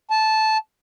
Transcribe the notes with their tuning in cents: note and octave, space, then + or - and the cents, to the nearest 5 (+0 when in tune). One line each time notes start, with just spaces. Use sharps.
A5 -10